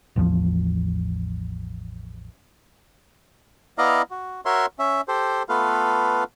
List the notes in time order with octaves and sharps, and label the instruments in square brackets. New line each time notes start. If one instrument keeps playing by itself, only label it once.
[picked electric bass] A1 E2 F3
[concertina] B3 E4 D5 D#5 F5 A#5
F#4
F#4 A#4 C#5 E5 C6
C#4 E5
G4 A4 C5
A3 B3 F4 A4 B4 F5